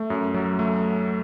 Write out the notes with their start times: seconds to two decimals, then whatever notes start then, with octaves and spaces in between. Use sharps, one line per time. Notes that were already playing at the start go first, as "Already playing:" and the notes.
Already playing: A3
0.10 F#2
0.34 F#3
0.59 A3